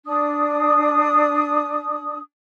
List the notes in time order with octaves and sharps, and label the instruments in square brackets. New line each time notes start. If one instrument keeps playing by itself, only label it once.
[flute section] D4 D#6